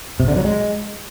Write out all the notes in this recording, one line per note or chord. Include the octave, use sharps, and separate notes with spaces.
C3
D3
F#3
G#3